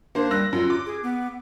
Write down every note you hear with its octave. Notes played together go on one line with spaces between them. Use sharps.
A#3 D4 C5
G3 E6 F#6 A#6
F#2 F4
D6
G#4
B3